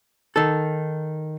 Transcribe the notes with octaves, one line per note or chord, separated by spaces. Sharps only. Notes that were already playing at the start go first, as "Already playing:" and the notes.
D#3 A4